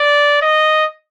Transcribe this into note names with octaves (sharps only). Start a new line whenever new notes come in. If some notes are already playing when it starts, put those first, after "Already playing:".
Already playing: D5
D#5